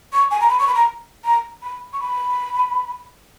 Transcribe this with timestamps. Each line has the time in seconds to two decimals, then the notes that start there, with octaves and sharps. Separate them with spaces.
0.13 C#6
0.31 G#5
0.41 A#5
0.49 B5
0.59 C#6
0.67 B5
0.75 A#5
1.25 A#5
1.62 B5
1.93 C#6
2.00 B5